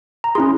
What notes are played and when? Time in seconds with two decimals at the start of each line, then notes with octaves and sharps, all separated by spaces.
0.24 A#5
0.35 C#4 E4 G#4 C6